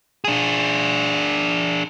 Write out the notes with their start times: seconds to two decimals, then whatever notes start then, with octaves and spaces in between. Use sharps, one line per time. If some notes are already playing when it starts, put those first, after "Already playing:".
0.24 D4 G#4